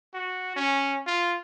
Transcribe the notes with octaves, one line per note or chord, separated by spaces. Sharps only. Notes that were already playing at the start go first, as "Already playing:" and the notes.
F#4
C#4
F4